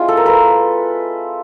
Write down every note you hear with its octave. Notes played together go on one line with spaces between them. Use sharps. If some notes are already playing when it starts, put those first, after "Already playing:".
Already playing: G#3 C4 E4 F4
A4
A#4
A4 B4